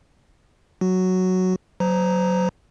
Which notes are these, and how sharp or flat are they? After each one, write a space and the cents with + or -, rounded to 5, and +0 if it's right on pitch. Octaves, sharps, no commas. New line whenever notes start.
F#3 +0 F#4 +0
F#3 +0 C5 -35 A#5 +0